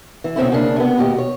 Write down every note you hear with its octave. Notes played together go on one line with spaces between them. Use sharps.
E3
B2 D3 C4 C#4 E4
C#3 A#3 C#4 D4
C3 B3
D#2 B2 G4 D#5
C#5